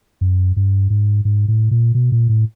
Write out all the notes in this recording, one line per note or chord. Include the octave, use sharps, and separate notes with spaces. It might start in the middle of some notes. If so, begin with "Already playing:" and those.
F#2
G2
G#2
G#2
A2
A#2
B2
A#2
A2